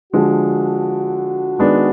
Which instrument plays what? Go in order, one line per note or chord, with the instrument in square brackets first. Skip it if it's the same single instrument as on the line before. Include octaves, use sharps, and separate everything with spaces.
[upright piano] D3 F3 G#3 [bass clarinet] F#4
[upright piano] D#3 G#3 B3 D4